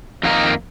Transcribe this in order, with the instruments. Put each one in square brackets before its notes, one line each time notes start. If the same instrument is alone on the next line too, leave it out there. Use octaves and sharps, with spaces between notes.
[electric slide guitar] F2 D#3 A#3 D#4 A#4